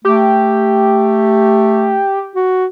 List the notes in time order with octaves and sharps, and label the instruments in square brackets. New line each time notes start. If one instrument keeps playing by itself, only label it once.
[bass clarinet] A3 [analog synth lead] G4
[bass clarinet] F#4